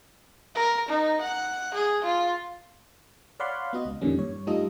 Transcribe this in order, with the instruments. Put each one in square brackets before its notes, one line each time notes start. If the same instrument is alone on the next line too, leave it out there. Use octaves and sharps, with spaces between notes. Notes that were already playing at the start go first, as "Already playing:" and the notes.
[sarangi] A#4
D#4
F#5
G#4
F4
[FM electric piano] C#5 D5 F5 F#5 B5 C6
B3 F#4 D#5
C#2
F2 A#2 D3 D#3 G3 C#4
G2 C#5
G3 A3 D#4 F4 A4 D#5